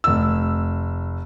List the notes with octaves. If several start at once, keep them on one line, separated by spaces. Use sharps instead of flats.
F1 E6